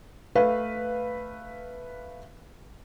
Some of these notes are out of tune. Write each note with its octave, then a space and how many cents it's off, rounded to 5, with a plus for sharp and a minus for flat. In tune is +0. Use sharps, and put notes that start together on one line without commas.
A3 +0 B4 +0 F5 +0